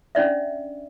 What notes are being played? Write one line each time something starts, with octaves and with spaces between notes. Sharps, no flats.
C#4 D4 D5 E5